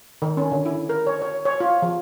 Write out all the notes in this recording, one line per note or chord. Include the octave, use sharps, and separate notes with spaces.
D#3
C#4
D3
E4
A#4
C#5
C#5
C#5
F4
F3